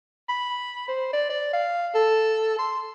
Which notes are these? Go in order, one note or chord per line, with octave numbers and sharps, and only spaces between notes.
B5
C5
D5
D5
F5
A4
C6